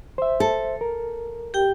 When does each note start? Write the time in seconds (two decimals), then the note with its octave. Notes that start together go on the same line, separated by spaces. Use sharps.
0.18 C5 E5
0.40 A4
0.81 A#4
1.54 G4 G5